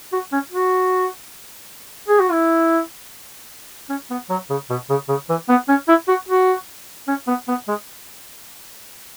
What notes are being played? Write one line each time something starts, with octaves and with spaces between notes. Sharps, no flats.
F#4
C#4
F#4
G#4
F#4
E4
C#4
B3
F#3
C#3
B2
C#3
C#3
E3
B3
C#4
E4
F#4
F#4
C#4
B3
B3
G#3